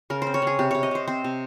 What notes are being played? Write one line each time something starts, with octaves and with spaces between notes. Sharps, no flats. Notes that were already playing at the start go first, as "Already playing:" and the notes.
C#3 A#4
C5
C4
C#5
C#3 G#4
C3 G4
C3 C#5
D#5
C3 C5
C4 C5
C3